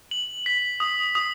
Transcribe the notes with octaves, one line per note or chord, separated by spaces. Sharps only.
F#7
B6
D#6
D#6